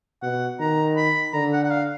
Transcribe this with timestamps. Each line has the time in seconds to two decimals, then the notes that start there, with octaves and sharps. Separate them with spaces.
0.22 B2 F#5
0.60 D#3 A#5
0.97 B5
1.33 D3 A#5
1.53 F#5
1.64 F#5
1.71 F5